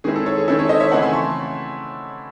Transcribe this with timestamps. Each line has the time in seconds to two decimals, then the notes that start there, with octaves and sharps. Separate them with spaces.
0.04 D#3 G#3 C4 E4 G#4
0.16 A4
0.26 A4 C#5
0.38 G#4
0.48 D#3 G#3 C4 E4 A4
0.59 A4 C#5
0.69 C5 D#5
0.80 C#5 E5
0.91 C#3 E3 A3 C4 E4 F#5 A5
1.02 G#5 C6
1.13 A5 C#6